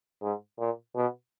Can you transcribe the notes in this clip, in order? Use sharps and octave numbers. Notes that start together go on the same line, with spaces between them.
G#2
A#2
B2